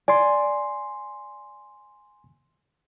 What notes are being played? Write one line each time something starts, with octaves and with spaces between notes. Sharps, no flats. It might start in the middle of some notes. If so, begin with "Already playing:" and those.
D5 G#5 C6